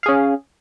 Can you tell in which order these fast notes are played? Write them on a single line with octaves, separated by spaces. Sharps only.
F5 G#4 C#4